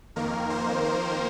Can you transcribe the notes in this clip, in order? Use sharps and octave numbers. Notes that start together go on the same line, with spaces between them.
F2 D#3 A#3 A#4
C5
A#4